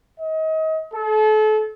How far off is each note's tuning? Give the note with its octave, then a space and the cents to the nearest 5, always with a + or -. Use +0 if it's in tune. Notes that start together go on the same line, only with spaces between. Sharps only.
D#5 +30
A4 -35